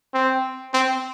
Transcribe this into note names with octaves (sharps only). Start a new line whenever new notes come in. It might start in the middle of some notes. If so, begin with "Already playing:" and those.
C4
C4